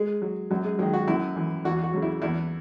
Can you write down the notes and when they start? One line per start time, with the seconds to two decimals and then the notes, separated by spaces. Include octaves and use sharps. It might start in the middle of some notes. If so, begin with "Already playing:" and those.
Already playing: G#3
0.22 F#3
0.51 F#2 F#3
0.65 G#3
0.79 D#3 F#3 G#3
0.93 F#4
1.08 F#2 E4
1.36 E3
1.65 E2 F#4
1.83 F#4
1.94 C#3 F#3
2.02 E4
2.22 E2 E4